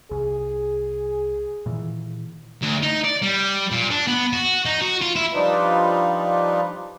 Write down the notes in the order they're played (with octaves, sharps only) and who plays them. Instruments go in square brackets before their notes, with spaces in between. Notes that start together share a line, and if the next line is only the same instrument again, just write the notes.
[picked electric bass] C2 [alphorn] G#4
[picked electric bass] A#2 D#3 E3
[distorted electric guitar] D2
D#4
D5
G3
A#2
D4
B3
F#4
D#4
F#4
F4
E4
[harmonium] F3 G3 D4 D#4 F4 B4